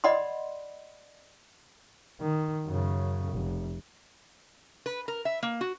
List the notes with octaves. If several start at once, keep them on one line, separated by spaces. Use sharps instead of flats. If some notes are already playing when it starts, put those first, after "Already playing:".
D5 D#5 F#5 B5 C6
D#3
F#2 C#3
F1
B4
A#4
E5
A#3
F#4